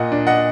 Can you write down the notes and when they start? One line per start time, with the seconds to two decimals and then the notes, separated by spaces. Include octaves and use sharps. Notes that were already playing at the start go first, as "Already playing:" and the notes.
Already playing: A#2 D#5 F#5
0.12 D4
0.27 D#5 F#5